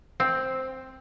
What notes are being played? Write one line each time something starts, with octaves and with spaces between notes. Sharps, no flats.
C4